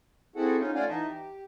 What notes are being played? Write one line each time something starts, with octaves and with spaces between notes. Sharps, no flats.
C4 E4 F#4 G#4 A4 F#5
C#4 D#4 F4
A3 F4 D5 F5 F#5 G#5
E3 D#4 D#5 E5 A5
G4